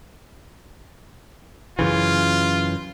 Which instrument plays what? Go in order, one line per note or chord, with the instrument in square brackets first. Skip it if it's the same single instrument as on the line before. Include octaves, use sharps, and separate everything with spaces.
[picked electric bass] F#2 C#3 E3 [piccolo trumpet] F4